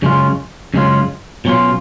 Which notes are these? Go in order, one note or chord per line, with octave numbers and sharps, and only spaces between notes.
F#2 C#3 G#3 C#4 F4
F#2 C#3 G#3 C#4 F4
B2 F#3 C#4 F4